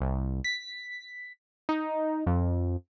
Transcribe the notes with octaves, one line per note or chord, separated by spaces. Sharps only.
C2
B6
D#4
F2